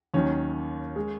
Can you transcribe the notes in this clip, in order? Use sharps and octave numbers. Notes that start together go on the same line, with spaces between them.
D#2 D#3 F#3 C#4
G#3